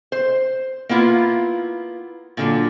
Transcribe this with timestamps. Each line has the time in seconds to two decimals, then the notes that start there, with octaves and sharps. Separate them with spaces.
0.12 C5
0.89 A#3 B3 E4 F4
2.37 A#2 D3 F#3